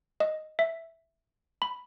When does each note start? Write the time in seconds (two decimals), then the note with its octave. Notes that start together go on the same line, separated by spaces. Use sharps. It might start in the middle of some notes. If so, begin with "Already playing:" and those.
0.20 D#5
0.59 E5
1.62 B5